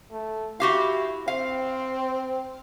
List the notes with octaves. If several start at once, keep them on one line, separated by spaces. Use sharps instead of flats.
A3
E4 F#4 G4 F5
C4 F5